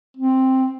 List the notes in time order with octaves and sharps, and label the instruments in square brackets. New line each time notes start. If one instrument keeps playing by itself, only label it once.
[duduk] C4